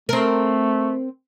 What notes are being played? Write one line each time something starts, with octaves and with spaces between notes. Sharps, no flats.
A3 C4 A#4